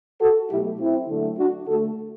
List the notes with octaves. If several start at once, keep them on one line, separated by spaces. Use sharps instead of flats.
F#4 A4
B2 F#3 A3 E4 G4
C4 E4
D3 F#3 A3
D4 F#4
D3 A3 F#4 A4